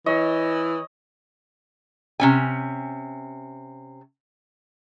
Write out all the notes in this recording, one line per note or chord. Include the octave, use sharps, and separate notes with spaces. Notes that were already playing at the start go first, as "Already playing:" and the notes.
E3 C#5 D#5
C3 C#4 G#5